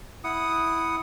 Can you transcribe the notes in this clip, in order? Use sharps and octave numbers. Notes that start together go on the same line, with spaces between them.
E4 F#5 D#6